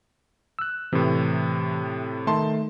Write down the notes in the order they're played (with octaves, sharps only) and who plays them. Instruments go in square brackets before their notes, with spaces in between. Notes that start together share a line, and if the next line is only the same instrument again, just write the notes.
[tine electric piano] E6 F#6
[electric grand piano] A2 C3 [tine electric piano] E3
[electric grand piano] D#3 A5 C6 [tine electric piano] A3